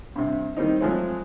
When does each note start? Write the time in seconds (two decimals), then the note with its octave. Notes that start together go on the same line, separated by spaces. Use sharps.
0.16 G2 C3
0.57 D#3 G3 C4 D#4
0.81 F3 F#3 G#3 A3 C4